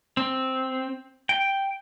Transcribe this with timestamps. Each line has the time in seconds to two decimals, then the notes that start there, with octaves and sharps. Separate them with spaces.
0.17 C4
1.29 G5